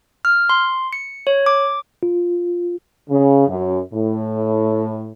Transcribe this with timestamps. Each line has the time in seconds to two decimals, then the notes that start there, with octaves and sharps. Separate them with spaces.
0.25 F6
0.49 C6
0.93 C#7
1.27 C#5
1.46 D6
2.03 F4
3.10 C#3
3.47 F#2
3.93 A2